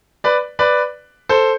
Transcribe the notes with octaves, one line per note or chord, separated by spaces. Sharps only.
B4 D5
B4 D5
A4 C5